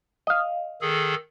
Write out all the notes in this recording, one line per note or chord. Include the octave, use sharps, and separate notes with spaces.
D#5 F5
D#3 G#4 A4